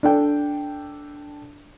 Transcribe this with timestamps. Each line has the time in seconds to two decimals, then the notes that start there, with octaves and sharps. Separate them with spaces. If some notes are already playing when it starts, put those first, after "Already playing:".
0.03 D4 A4 G5